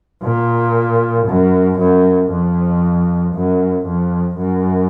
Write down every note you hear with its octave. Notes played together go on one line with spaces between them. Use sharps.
A#2
F#2
F#2
F2
F#2
F2
F#2